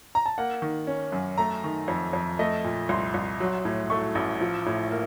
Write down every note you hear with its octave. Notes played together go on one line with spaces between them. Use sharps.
A#5
A5
A#3 F#5
D#3
C#4
F#2
A3 A#5
D#3
F2
F2
A3 D#5
A#2
C2 C6
C2
F#3
A2
A3 C#6
A1
F3
A2
A#3